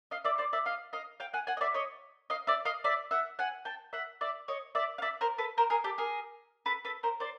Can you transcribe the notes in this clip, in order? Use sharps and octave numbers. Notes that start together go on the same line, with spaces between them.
D#5 F5
D5 E5
C5 D5
D5 E5
D#5 F5
D#5 F5
F5 G5
F#5 G#5
F#5 G#5
D#5
D5 E5
C#5 D#5
D#5 F5
D5 E5
D#5 F5
D5 E5
E5 F#5
F#5 G#5
G5 A5
E5 F#5
D5 E5
C#5 D#5
D5 E5
F5
D5 E5
A#4 C5
A4 B4
A#4 C5
G#4 A#4
G4 A4
G#4 A#4
A4 B4
A4 B4
A#4 C5
C5 D5